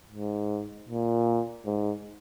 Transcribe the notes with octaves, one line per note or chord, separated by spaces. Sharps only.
G#2
A#2
G#2